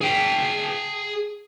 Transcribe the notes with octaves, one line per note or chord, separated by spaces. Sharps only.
G#4 G5